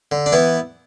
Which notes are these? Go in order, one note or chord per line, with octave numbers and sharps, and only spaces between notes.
D3
D4
E3 B3 E4